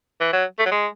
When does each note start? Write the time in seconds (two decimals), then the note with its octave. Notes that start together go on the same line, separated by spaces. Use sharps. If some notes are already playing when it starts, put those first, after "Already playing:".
0.21 E3
0.33 F#3
0.59 A3
0.66 F#3
0.71 G#3